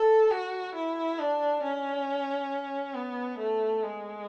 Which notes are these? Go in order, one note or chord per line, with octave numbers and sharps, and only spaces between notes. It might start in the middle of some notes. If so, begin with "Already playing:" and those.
Already playing: A4
F#4
E4
D4
C#4
B3
A3
G#3